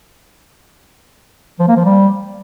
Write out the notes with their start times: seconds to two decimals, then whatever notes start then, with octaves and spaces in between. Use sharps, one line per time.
1.60 F3
1.68 A#3
1.76 F3
1.85 G3